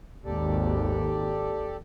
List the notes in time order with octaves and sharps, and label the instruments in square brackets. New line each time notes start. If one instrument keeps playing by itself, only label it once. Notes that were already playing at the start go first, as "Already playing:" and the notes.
[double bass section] G#1 D#2 [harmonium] G4 A4 D5